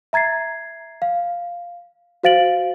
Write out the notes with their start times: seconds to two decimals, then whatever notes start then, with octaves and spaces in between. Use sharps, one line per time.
0.13 E5 A#5 G#6 A6 C7
1.02 F5
2.23 F#4 C5 F5 A6 D7 F#7